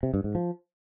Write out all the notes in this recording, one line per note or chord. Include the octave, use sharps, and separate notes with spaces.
C3
G2
G#2
F3